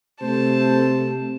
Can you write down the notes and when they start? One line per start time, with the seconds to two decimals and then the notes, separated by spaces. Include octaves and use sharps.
0.21 C3 A3 C5 A5